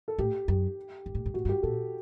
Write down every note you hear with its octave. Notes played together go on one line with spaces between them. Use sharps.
A4
A2 G4
F#2 G4
G2
A2
G2
A2 F#4
G2
G4
A#2 A4